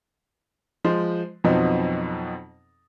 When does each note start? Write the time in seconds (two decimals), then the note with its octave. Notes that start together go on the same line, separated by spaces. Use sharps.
0.84 F3 G#3 C5
1.44 F2 B2 F3 F#3 C4 D#4